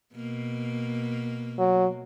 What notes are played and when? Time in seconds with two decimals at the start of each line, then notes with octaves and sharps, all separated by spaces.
0.14 B2 A#3
1.58 F#3